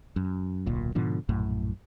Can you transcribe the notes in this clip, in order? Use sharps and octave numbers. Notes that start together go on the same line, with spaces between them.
F#2
D1 B1 A#2
G#2 B2 D3 F3
A#1 F#2 A2